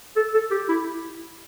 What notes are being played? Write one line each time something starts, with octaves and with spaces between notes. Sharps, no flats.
A4
A4
G4
E4